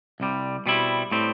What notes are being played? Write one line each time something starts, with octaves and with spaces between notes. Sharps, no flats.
C2 C3 G3
B2 G3 C4 E4
A2 G3 C4